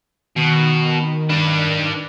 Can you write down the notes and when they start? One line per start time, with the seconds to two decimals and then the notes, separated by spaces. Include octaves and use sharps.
0.36 B2 D#3
1.29 D4 B4